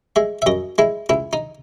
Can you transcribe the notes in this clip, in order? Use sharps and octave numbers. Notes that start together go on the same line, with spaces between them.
G#3 E5
E5
F#2 D#5
G#3 E4
C#2 E4
D#4